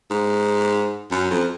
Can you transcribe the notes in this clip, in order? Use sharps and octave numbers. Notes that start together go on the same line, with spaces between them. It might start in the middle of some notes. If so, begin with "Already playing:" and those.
G#2
F#2
F2